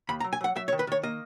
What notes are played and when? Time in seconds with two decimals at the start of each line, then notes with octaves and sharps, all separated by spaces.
0.09 D#2 B5
0.20 A#5
0.24 F#3
0.33 G#5
0.41 F#3 F#5
0.56 F#3 E5
0.68 C#5
0.72 D#3
0.79 B4
0.87 D#3 C#5
1.03 A#3 D#5